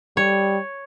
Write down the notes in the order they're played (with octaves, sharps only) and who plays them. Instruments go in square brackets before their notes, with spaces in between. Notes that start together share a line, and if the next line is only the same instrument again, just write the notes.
[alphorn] G3 [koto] C#5